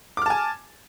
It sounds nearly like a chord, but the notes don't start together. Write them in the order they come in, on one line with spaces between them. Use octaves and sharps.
D6 F6 A5 G#5